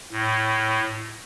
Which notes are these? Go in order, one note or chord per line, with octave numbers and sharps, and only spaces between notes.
A2